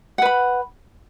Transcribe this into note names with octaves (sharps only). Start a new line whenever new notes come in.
B4 F#5 B5